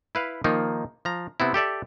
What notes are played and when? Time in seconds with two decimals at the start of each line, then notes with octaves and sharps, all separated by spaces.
0.15 E4 B4 F5
0.44 D#3 F3 A#3 D#4
1.05 F3 A#5
1.40 C3 B3 C4 E4
1.54 G4 A4 D5 E5